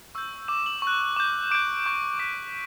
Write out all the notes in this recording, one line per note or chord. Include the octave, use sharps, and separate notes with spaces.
C#6 E6 G6
D6 G6 E7
F#7
C#6 F#6
D6 G6
D6 G6 D7
C#6 G6
D6 F#6 B6